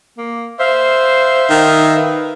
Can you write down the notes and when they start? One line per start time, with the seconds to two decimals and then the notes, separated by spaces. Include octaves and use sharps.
0.18 A#3
0.59 C5 E5 F5
1.50 D#3
1.95 B4